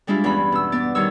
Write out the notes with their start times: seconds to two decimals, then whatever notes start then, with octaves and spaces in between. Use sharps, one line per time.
0.07 G3 G#3 D4 E4 F4
0.24 E2 G2 E3 C#4 B5
0.52 B2 E6
0.72 B3 D5
0.95 D#3 G3 D#4 C#5 E6